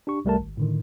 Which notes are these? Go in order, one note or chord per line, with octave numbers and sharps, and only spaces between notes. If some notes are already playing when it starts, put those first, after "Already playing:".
D4 G4 C#6
C2 G3 A3 A#4 A5
G#1
A2 D3 D#3